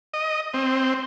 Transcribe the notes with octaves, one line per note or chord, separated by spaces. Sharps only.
D#5
C4